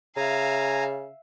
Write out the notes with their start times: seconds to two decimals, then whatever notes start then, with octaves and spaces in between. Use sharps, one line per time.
0.16 C#3 E5 F5 G#5 A#5